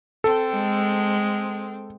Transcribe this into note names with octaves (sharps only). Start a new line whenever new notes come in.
C4 A4
G#3